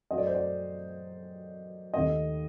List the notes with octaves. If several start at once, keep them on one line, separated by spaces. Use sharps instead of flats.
F#2 F#3 A3 D#5
D5
C5
D5
D#2 D#3 A3 D#5